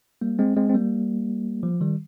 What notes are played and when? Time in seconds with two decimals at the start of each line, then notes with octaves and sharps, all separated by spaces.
0.21 G3 A#3
0.39 G#3 C4
0.57 G#3 C4
0.69 C4
0.74 G3 A#3
1.63 F3
1.81 D#3 G3